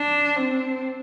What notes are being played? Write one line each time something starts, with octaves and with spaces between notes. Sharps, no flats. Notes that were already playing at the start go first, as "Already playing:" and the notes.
Already playing: D4
C4